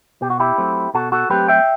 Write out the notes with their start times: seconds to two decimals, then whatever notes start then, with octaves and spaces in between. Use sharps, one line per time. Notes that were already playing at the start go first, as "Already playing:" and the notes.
0.22 B2 G4
0.30 F#4
0.40 E4 G4
0.58 F#3 A3 C4
0.94 B2 F#4 A4
1.12 F#4 A4
1.30 F#3 A3 C4 G4 B4
1.48 E5 G5